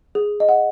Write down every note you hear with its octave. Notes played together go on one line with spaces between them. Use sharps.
G#4
D#5
F#5